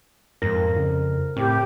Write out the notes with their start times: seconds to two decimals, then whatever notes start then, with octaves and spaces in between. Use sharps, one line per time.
0.42 F2 G#2 A#4 A#6
0.77 C#3
1.37 A2 C4 G4